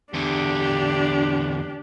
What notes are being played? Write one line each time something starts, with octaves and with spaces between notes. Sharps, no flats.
E2 D3 D4 G4